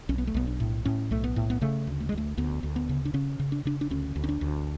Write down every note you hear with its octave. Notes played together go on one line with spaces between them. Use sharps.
B1 C#4
B3
A3
B1 B3
D4
A2
A2 C#4
B1 A3
B3
A2
B3
C#3 A3
D2
A3
G#3
D2
A3
D2 B3
D2
B3
C#3
D4
C#3 C#4
C#3
D4
C#3 D4
D4
D2 C#4
D2
C#4
D4
D2